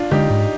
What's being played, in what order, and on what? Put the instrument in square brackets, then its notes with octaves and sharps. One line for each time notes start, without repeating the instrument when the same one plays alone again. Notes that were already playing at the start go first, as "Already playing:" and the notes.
Already playing: [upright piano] D4 F4
[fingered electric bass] D3 G#3 [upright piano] D#4 G4
[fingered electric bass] G#2